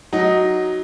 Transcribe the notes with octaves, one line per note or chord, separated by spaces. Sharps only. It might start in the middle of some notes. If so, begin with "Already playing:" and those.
F#3 D#4